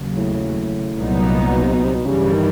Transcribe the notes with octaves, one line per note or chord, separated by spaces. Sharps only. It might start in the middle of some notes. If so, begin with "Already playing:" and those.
Already playing: D#2 C#3 F#3
A2
C2 A#2 F#3 B3 D#4
B2
C3
B2
C3
B2
G2 C#3 E3 G3
D#3